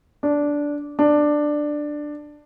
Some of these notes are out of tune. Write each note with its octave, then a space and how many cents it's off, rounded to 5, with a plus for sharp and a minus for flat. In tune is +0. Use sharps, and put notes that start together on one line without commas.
D4 -10
D4 +10